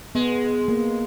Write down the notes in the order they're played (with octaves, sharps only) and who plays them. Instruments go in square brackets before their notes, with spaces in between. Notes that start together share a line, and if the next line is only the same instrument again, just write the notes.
[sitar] G#3 [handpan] B3
[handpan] A#3